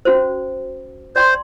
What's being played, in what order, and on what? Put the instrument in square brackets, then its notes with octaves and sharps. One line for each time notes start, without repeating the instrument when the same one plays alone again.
[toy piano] C#4 F#4 C5
[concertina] C5 [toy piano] D5 G5 C6